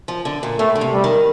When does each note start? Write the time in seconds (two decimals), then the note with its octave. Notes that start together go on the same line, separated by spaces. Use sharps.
0.08 F3
0.25 D3
0.43 A#2
0.59 A2 A3
0.75 D3
0.81 C3
0.93 G3
1.04 D#3